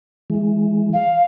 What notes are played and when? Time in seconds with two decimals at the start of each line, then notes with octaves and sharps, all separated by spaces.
0.30 E3 G#3
0.93 F5